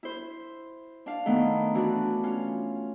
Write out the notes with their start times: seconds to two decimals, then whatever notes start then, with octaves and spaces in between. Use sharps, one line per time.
0.03 E4 C5
1.06 D4 F5
1.26 D#3 A3 B3
1.75 E3 D4 F#4
2.24 C#4 F4